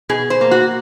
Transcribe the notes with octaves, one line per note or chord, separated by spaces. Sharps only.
B2 G#4
C5
A#3
F#4